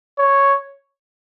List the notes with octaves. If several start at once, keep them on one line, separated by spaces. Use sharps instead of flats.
C#5